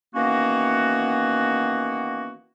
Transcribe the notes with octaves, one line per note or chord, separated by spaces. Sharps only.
D#3 E3 A#3 B3 C#4 F#4